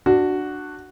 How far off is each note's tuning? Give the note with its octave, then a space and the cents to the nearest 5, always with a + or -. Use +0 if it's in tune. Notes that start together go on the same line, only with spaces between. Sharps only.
D4 +15 F#4 +0